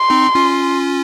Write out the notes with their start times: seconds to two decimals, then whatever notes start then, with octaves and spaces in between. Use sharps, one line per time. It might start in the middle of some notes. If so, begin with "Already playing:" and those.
Already playing: C6
0.10 C4 D#4
0.35 C#4 F4